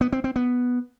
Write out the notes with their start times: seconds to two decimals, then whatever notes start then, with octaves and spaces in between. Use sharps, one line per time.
0.01 B3
0.13 C4
0.24 C4
0.36 B3